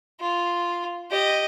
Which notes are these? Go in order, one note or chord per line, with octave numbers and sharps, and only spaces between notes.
F4
G4 D#5